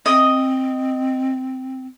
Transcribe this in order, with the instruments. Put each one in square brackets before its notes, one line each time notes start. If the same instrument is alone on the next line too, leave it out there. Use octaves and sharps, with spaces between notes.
[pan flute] C4 [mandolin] D#5